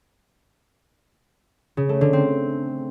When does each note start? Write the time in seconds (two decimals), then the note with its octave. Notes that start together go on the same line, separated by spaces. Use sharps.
1.77 C#3
1.89 A3
2.01 D3
2.13 C4